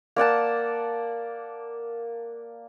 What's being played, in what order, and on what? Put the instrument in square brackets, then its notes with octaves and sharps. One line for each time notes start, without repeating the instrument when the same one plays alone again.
[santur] A#3 D5 F#5 A5